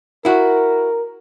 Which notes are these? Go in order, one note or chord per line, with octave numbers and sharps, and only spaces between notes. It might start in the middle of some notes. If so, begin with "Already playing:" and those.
E4 F#4 A#4